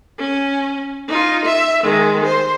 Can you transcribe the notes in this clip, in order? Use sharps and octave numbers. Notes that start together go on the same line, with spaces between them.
C#4
D#4 F4
E5
D#3 G#3
C5